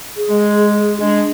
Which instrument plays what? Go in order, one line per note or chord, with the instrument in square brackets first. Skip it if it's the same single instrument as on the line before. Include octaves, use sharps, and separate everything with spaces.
[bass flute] G#4
[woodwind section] G#3
[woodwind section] G#3 [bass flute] D4